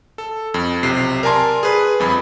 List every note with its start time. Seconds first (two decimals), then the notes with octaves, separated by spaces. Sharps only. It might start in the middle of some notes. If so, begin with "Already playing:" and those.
0.18 A4
0.54 F2
0.83 B1 C3 C7
1.23 A#4 D5 G#5 A5 C6
1.63 G#4 B4
2.00 G1 F2 B5